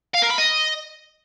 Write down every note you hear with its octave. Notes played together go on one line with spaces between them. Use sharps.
F5
A#4
B5
D#5